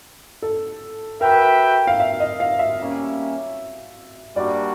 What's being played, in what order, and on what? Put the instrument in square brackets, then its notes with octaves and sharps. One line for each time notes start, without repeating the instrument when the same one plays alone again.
[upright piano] A4
[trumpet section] F#4 B4 E5 G5 [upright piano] A#4
[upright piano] F5
E5
D#5
F5
E5
[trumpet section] G3 A#3 C#4
[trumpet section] G3 A#3 D4 F#4 [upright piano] D5